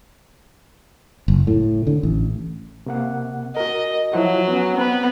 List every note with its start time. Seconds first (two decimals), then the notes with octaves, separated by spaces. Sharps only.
1.28 F#1
1.47 A2
1.87 D3
2.03 A1
2.86 C3 A#3 F#5
3.57 F#4 A#4 D#5
4.13 F3 F#3 E4 F#4
4.48 B3 C#4
4.78 B3 C4 B4